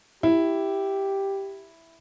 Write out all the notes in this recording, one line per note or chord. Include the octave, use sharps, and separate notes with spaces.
E4 G4